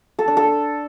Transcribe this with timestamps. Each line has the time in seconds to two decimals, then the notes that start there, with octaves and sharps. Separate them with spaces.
0.19 A4
0.28 D4
0.37 A4